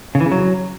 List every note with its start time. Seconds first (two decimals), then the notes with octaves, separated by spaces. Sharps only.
0.15 C#3
0.20 E3
0.26 C#3
0.32 F#3